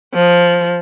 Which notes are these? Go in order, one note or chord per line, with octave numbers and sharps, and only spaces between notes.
F3